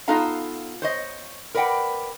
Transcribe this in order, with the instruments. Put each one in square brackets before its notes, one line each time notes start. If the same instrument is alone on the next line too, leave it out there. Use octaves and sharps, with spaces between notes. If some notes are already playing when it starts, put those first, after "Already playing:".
[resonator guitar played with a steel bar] B3 D#4 F4 A4 F5 A#5
C5 C#5 D#5
A#4 B4 D5 F#5 G5